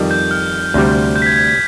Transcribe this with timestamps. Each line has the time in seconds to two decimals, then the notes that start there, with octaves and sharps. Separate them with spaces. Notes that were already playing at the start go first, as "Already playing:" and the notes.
Already playing: F2 D#3 G3
0.11 G6
0.31 F6
0.74 D2 C3 G3
1.16 G6
1.22 B6
1.26 G#6
1.37 G#6
1.48 B6